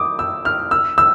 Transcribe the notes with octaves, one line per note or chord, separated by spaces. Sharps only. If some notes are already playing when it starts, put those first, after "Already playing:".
Already playing: D6 D#6
E6
F6
E6
E6